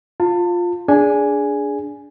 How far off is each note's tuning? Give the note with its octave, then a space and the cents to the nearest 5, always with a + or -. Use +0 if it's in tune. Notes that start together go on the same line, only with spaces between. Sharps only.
F4 +5 A5 +35
D4 -15 G#4 +0 G#5 +0